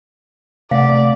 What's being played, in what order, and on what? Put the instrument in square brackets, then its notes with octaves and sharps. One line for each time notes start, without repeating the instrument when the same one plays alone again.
[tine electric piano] C3 A3 [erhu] D5 [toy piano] F5 F#5